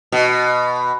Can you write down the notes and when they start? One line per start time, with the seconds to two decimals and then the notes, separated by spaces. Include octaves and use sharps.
0.12 B2